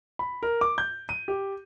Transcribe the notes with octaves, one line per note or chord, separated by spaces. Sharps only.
B5
A#4
D6
G6
D#7
G4